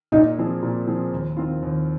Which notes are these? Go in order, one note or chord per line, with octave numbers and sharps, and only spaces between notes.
A#2 D#4
F3 C4 G#4
A#2
F3 C4 G#4
D#2
D#3 C4 F4
D#2